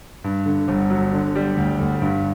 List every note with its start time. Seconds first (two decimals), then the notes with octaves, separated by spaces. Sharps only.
0.24 G2
0.46 D3
0.68 G1
0.90 F#3
1.13 D3
1.35 G3
1.57 D2
1.80 D2
2.02 G2